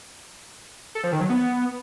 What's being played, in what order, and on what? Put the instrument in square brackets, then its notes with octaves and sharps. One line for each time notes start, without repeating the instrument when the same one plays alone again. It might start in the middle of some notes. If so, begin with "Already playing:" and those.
[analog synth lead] A4
F3
D#3
F#3
B3